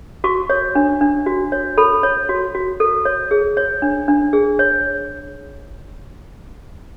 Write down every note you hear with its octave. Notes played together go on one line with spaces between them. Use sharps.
F#4 C#6
C#5
D4
D4
F#4
C#5
A4 B5
C#5
F#4
F#4
A4
C#5
G#4
C#5
D4
D4
G#4
C#5